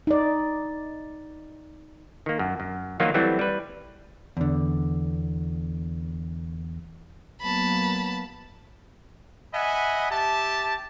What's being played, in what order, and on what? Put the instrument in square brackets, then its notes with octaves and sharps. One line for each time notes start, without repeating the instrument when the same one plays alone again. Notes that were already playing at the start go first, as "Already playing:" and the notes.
[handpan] D#4 D5
[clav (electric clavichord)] D#3 A#3
F#2
F#2
D#3 F3 F#3 A#3 F4
E3 F#3 G3 A3 C4 E4
G3 B4
[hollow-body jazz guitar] E2 D3
[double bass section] F#3 A#3 B3 [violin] A5 B5
[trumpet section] D#5 E5 F#5 G#5 B5
G4 E5 A5